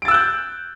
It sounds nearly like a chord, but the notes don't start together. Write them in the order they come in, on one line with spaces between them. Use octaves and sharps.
D7 A6 E6 F#6 G6